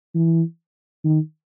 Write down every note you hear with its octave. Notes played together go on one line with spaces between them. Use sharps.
E3
D#3